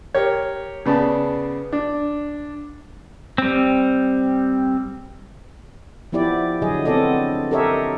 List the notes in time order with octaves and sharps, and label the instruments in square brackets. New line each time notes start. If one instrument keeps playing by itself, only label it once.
[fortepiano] G4 A#4 C#5
C#3 B3 D5 A5
D4
[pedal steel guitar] G3 C4
[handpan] F3 B3 E4 G4 D5
D3 F#3 G#4 D#5
B3 C4 D4 A4 D5 D#5
G4 A4 A#4 C#5 D#5 E5